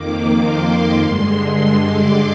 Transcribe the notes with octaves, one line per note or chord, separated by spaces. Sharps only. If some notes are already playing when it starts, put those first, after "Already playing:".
Already playing: F2 D#3 A#3 D6
C6
G2 D3 G#3
C6
D6